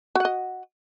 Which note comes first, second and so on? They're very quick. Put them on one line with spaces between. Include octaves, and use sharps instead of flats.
F#4 F#5 D#5